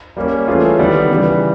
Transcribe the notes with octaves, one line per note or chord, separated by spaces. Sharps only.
G3 A#3 C#4
E3 A3 C#4 F4 G#4
D#3 G3 B3
C#3 E3 G3